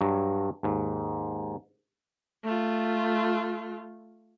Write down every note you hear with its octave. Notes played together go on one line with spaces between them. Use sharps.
G2 F#3
D#2 G#2
A3 F4